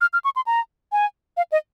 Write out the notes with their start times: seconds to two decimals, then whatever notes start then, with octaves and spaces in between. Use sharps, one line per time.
0.01 F6
0.13 F6
0.24 C#6
0.36 C6
0.47 A#5
0.92 G#5
1.37 F5
1.52 D#5